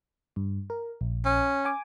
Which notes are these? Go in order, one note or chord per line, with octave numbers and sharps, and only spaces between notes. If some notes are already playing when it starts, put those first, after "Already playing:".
G2
A#4
A#1
C#4
G#5 D6